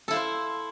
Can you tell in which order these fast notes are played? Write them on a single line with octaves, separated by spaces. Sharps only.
A4 E4 F5 C5